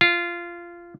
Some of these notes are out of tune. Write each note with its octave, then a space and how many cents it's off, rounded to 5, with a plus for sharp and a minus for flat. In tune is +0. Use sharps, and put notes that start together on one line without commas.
F4 -15